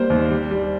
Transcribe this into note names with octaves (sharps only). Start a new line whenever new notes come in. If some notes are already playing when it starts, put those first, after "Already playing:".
Already playing: G3 A#3 C5
D#2
G3
G3